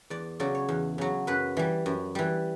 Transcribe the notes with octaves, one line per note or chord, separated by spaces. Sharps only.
E2 D5
C#3 F#3 D5
C#5
E2
C#3 F#3
F#2 B4
E3 G3
F#2
E3 G3